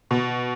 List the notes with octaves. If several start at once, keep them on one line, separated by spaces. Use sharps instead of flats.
B2